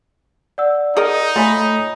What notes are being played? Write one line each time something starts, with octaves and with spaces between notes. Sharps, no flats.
D5 F#5 E6
D#4 G#4 A#4 D#5
A3 F4 A4 C#5 G#5 B5